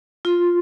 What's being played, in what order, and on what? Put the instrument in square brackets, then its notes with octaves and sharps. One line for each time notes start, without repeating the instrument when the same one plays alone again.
[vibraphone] F4